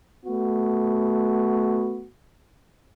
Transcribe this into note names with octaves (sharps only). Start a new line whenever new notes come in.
A3 B3 F#4